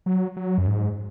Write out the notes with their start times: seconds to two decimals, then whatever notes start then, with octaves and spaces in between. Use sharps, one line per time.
0.06 F#3
0.36 F#3
0.58 F#2
0.67 G#2